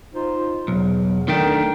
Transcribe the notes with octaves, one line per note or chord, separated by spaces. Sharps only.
D#4 F4 C5
B1 E2
D#3 A3 D4 A#4 G5